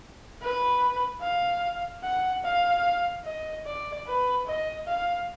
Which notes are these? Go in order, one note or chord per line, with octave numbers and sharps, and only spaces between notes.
B4
F5
F#5
F5
D#5
D5
B4
D#5
F5